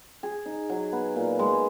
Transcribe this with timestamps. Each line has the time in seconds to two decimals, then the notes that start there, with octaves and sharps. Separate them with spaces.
0.23 G#4
0.46 D#4
0.70 F#3
0.93 B3
1.16 A#2
1.39 G#3